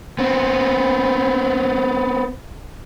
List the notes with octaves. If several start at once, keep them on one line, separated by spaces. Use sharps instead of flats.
B3 C4